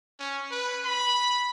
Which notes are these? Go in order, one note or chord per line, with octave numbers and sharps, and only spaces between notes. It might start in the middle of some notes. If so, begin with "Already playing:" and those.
C#4
B4
B5